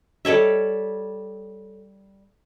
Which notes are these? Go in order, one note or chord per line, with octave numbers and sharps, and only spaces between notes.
G3 A4 C#5 E5